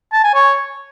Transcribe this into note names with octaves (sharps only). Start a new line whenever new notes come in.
A5
G#5
C#5